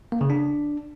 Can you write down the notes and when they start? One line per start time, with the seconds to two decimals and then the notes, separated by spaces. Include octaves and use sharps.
0.12 A#3
0.21 C#3
0.30 D4